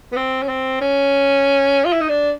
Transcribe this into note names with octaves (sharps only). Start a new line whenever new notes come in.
B3
C4
C#4
C4
C#4
F4
E4
D#4
D4